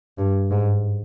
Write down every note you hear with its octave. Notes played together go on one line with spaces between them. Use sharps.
G2
G#2